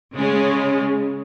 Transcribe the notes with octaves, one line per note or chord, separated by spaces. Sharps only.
C#3 G#3 C#4